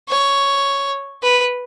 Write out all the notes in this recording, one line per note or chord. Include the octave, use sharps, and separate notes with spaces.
C#5
B4